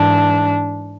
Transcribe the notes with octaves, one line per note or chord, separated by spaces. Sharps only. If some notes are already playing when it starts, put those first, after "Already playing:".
Already playing: G#2 E3 D4